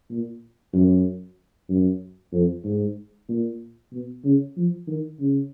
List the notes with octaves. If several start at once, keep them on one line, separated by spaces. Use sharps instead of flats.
A#2
F#2
F#2
F2
G#2
A#2
B2
C#3
F3
D#3
C#3